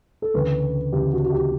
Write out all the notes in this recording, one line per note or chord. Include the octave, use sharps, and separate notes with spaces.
A4
D2 C#3 E3 B4
D2 C#3 E3 G4
F#4
F#4
G4